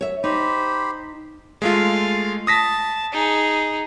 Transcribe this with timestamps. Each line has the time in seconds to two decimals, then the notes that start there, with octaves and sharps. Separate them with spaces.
0.01 C#5 E5
0.24 D#4 G4 C5 B5
1.62 G#3 A3 F4 F5
2.47 A5 D#6 A#6 B6
3.12 D#4 G#4